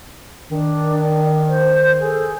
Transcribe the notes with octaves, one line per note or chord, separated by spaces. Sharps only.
D#3 D4
C5
G#4 A4